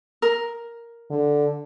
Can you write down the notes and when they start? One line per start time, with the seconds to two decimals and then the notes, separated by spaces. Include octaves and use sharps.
0.22 A#4
1.10 D3